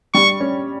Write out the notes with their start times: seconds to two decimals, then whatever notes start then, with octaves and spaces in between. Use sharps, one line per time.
0.14 G3 C#6
0.40 C#4